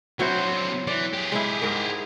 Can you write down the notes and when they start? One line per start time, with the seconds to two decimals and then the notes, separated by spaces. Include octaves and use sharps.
0.19 D3 F#3 C4 E4 C5
0.87 E3 D5
1.14 G4 G#4
1.32 G#3 E4
1.62 G#2 A#4